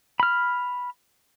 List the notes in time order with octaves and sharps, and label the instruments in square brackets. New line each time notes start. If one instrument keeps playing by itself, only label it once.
[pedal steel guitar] B5 F6